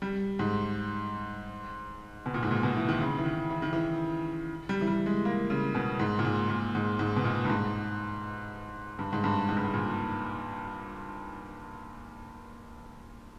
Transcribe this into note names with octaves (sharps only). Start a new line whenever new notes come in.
G3
G#2
B2
A#2
G#2
A#2
B2
E3
D#3
C#3
E3
D#3
E3
D#3
E3
G3
E3
G3
G#3
A#3
C#3
B2
G#2
A#2
G#2
A#2
G#2
G#2
B2
A#2
G2
G#2
G2
G#2
G2
G#2
G2
G#2
A#2